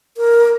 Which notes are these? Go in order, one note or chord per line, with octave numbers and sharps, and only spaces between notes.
A#4